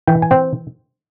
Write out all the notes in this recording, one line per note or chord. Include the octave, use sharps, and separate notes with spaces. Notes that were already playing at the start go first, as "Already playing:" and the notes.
E3 G5
G#5
C4 G5